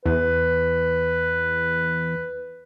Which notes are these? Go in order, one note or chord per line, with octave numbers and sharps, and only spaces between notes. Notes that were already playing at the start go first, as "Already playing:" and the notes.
E2 B4